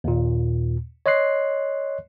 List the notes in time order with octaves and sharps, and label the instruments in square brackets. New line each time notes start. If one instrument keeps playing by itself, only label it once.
[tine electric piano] D#2 A#2
C#5 D#5 C6 F#6 C7